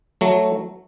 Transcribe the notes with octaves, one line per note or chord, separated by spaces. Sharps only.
F#3 A3